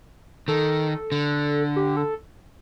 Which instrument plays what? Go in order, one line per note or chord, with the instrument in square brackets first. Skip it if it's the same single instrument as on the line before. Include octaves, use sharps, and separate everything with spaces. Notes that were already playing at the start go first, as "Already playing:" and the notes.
[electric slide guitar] D#3 [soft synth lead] A4
[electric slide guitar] D3
[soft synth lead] G4
A4